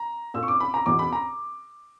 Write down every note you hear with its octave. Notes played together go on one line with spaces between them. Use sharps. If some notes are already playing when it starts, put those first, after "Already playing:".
Already playing: A#5
A#2 E6
C#6
D6
B5
A#5
E2 B2 D6
B5
A#5